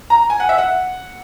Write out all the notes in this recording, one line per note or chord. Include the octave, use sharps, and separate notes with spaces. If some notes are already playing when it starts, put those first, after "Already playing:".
A#5
G#5
F#5
E5
F#5